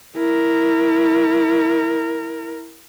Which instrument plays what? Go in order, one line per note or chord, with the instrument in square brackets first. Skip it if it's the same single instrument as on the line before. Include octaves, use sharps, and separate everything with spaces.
[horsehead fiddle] E4 A#4